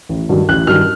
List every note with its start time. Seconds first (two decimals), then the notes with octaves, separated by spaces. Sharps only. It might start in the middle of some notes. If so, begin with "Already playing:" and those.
0.09 A1
0.29 G2 D#3 F#3
0.48 A1 F#6
0.67 G2 D#3 F#3 F6